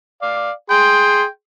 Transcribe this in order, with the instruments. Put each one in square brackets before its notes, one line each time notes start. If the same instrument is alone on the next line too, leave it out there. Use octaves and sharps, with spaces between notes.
[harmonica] D5 F5
[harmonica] G#4 C6 [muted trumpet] G5